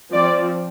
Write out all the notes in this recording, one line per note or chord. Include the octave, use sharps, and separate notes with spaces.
F3 C4 D5